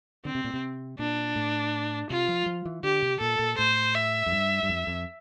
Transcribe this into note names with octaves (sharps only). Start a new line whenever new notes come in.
D3 C4
C3
A#2
C3
A#2 D4
A2
C3 F4
F3
F3
E3
D3 G4
C3
A#2 A4
A#2
A2 C5
E5
F2
G2
G2
F2
F2